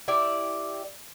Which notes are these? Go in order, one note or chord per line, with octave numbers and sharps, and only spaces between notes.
E4 G4 D5